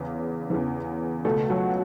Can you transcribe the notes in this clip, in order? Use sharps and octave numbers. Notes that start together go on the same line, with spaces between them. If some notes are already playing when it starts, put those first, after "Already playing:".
Already playing: E2 C#3 E3
E2 C#3 E3
C#2 B2 A3 A4
F#3 F#4